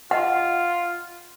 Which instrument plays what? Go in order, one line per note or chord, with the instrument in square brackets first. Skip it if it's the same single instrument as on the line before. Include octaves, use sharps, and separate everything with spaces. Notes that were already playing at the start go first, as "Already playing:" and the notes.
[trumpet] F4 [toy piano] D#5 F#5